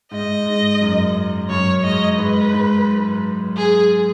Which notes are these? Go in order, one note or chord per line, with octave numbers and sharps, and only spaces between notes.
G#2 D#5
G#2
F#2
F#2 C#5
G#2 D#5
G#2 B4
G#2
G#4